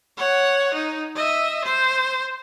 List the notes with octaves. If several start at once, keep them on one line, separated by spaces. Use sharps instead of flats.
C#5 F#5
D#4
D#5 E5
C5